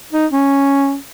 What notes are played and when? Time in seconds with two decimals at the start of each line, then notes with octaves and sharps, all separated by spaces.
0.13 D#4
0.31 C#4